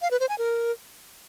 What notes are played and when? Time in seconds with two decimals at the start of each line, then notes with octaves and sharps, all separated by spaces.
0.02 F5
0.11 B4
0.20 C5
0.29 G#5
0.38 A#4